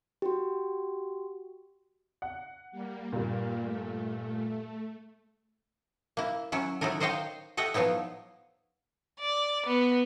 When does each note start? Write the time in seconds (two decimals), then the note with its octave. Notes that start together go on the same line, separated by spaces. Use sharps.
0.22 F#4 G4
2.22 F#5
2.72 G3 A#3
3.12 G2 A#2
3.63 A3
6.17 A#3 E4
6.52 F#3 C#4 E4
6.81 F#3 D#4 E4 A4 A#4
7.00 A#4 C5 C#5 D#5 F5 G5
7.57 A4 D#5 E5 F#5 G5
7.74 F3 F#3 B3 D#4 E4
9.19 D5
9.66 B3